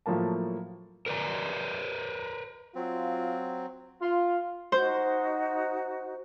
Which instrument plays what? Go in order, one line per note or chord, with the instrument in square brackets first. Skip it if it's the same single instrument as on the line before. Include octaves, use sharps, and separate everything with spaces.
[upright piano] A2 F3 F#3 A#3 A5
[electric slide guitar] A#4 B4 D5 A#5
[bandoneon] F#3 C4 [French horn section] F4
[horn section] F4
[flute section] D#4 F#4 [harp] C5